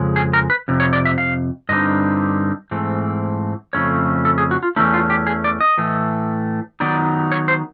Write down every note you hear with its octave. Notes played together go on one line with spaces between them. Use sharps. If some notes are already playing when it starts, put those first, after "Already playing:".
Already playing: F2 C#3 G#3
G#4
A#4
B4
F2 C3
C#5
D5
E5
F5
G2 D3 G3 C4 D#4 D#5
G#2 E3 A3 C4
F2 C#3 E3 A3 C#4 C#5
A4
G#4
F#4
F4
E2 C#3 E3 A3 C#4 E4
F4
G4
G#4
D5
D#5
A2 E3 A3
D#3 F#3 B3 D#4 D5
C#5
C5